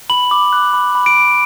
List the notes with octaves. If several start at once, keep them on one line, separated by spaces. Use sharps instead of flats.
B5 F#7
D6
F#6
B5
B5
D7
D6